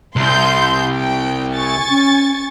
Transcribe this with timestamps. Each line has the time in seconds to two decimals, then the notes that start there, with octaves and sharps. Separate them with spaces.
0.16 C2 C6 G6
0.96 G5
1.54 G#5 C#6 A6
1.89 C#4